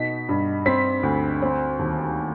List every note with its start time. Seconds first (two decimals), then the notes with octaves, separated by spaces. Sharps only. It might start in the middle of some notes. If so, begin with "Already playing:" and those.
Already playing: B2 D#4 B6
0.29 G2
0.66 C4 B6
1.03 D2
1.42 C4
1.79 D#2